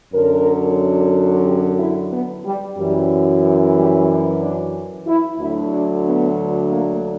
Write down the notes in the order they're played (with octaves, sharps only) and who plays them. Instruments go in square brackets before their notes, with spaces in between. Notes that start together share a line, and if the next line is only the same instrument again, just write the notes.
[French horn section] F#2 D3 F#3 A#4
G4
E4
B3
G3
F#2 E3 G3
G3
D4
D4
E4
D2 D3 F#3 E4
D4
B3
A#3